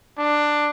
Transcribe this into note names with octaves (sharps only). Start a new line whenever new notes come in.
D4